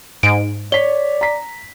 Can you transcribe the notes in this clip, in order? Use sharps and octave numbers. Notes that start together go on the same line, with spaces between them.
G#2 D7
C#5 D5 B6 G7
A#5 B6